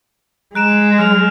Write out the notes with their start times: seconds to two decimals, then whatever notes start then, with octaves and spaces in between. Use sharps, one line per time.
0.55 G#3 A#5 F#6 D7 E7
0.99 F#3 F6 F7